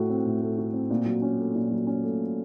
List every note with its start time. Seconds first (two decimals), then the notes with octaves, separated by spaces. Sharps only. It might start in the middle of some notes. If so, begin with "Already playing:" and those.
Already playing: A2 A3 F#4
0.10 C4
0.25 A2
0.41 A3
0.58 F#4
0.73 C4
0.90 A#2
1.06 F#3
1.22 C#4
1.38 A3
1.55 A#2
1.70 F#3
1.87 C#4
2.03 A3